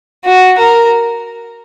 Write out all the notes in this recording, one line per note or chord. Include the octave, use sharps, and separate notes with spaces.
F#4
A#4